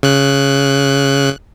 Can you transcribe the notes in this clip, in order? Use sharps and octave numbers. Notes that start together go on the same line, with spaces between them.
C#3 F#6